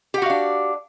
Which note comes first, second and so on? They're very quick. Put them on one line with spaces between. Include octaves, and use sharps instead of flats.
G4 F#5 F#4 F5 D4